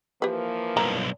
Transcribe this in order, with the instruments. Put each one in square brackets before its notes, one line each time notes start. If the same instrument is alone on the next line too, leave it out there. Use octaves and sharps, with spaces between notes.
[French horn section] E3 F3 A#3 [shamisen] G4 B4
[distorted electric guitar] B1 G2 [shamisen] A#5